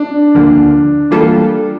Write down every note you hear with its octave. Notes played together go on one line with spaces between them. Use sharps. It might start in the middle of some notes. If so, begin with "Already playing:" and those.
Already playing: D4
D2 D3 F3 A#3
E3 G3 A#3 F4 A4